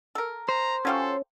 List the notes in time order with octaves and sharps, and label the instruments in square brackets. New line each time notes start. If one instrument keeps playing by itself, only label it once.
[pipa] A4 A#4
[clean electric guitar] C5 [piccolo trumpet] A#5
[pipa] F#3 F4 G4 [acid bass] C#4 [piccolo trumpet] A4